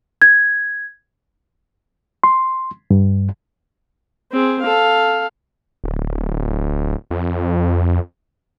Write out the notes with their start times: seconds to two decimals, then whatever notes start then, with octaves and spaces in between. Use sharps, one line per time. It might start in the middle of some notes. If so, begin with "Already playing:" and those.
0.22 G#6
2.24 C6
2.91 G2
4.32 C4 G#4
4.61 A4 F5
5.84 D1
7.11 F2